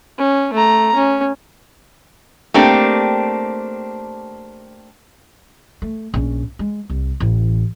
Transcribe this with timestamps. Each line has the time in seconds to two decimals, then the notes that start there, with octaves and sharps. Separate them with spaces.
0.18 C#4
0.54 A3 A#5
0.95 C#4
2.54 A3 A#3 C4 D4 G4
5.82 A3
6.14 A#1 C#4
6.59 G#3
6.90 C2
7.20 A1 E3